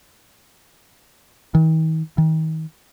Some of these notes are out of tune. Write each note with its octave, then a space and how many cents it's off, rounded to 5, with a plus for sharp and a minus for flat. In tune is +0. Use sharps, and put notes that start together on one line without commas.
D#3 +45
D#3 +35